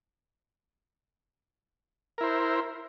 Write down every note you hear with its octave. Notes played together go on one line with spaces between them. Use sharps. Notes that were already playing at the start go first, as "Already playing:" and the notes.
E4 A#4 C5